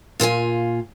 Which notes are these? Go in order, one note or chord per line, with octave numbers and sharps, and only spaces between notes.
A#2 F4 C5 G#5